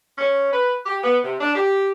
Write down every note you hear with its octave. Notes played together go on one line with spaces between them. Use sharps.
C#4
B4
G4
B3
C3
D4
G4